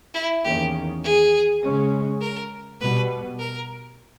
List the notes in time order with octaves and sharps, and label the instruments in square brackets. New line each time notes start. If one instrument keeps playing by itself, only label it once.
[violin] E4
[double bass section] E2 D#3 A#3 C#4 [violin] G4
[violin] G#4
[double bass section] C#3 G#3 C#4
[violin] A#4
[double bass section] B2 G3 B3 [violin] B4
[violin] A#4